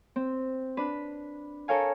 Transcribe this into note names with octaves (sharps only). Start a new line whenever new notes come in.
C4
D4 B4
A4 A#4 C#5 F5 G#5